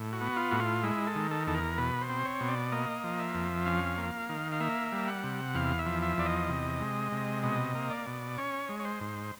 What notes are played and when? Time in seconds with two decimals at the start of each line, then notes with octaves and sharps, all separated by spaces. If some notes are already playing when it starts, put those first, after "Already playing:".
Already playing: A2
0.13 F#4
0.21 B3
0.37 F4
0.51 A2 F#4
0.60 F4
0.84 G#3 E4
1.07 A4
1.15 D#3
1.31 A4
1.47 E2 A4
1.55 A#4
1.78 B2 B4
2.01 C5
2.09 C4
2.25 C#5
2.41 B2
2.49 D5
2.72 A#3 D#5
3.04 F3
3.19 E5
3.35 F2
3.66 C#4 F5
3.98 A#3
4.29 D#3
4.52 F5
4.60 A#3 E5
4.92 G3
5.08 F#5
5.24 C3
5.55 E2 F5
5.79 E5
5.86 F3
6.02 E5
6.18 E2 D5
6.26 D#5
6.49 C3
6.81 G#3
7.12 C3
7.43 B2 D#5
7.75 A#3
7.90 D5
8.07 B2
8.38 C#4 C#5
8.69 G#3
8.80 C#5
8.85 C5
9.01 G#2